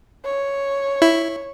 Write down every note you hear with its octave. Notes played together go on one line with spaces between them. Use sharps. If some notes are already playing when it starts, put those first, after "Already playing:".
C#5
E4